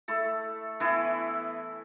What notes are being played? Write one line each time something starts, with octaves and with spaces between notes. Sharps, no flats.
A3 E4 A4
E3 B3 E4 B4